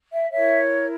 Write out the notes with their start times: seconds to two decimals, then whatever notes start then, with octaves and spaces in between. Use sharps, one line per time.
0.13 E5
0.32 E4 A#4 C#5 E5